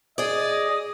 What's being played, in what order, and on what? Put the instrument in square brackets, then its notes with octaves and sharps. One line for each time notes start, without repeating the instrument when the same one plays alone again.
[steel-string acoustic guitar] G#4 D5 [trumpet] D#5 [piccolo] D#6